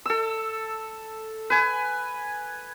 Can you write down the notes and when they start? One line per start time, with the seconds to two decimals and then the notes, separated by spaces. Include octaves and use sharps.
0.06 A4 E6
1.50 B4 G#5